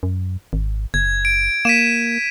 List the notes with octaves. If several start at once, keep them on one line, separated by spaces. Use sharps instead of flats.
F#2
G#1
F#1 G#6
D7
A#3 B6 D#7 E7